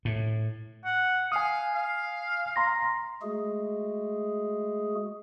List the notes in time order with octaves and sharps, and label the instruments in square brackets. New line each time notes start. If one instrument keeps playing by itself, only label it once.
[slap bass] A2
[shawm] F#5
[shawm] F5 [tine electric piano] G#5 D#6
[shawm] F5
[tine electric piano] A#5 C6 A#6
[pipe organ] G#3 A3 F#4 G#4